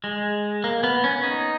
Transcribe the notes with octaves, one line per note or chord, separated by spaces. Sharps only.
G#3
A#3
B3
C#4
D#4